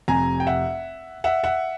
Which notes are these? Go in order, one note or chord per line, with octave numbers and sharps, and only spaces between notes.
F1 F2 C3 G#5 A#5
G5
E5 F#5
E5 F#5
E5 F#5